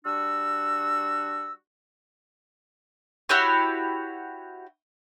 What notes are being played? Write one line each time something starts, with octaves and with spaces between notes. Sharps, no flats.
G3 D4 F#4 E6
E4 F#4 G4 C#5